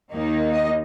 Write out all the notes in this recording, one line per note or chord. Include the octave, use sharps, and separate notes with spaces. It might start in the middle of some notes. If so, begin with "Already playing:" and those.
D#2 D#3 A#3 D#4
D#5